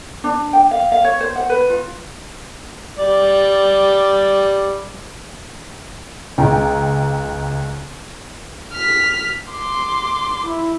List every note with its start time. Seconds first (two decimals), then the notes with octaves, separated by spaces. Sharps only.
0.24 D4
0.53 G5
0.71 F5
0.92 F5
1.04 C#5
1.21 C5
1.36 F#5
1.50 B4
1.70 F4
2.99 G3 D5
6.38 C#2 G5 A#5
8.73 F6 B6
9.51 C6 D6
10.46 E4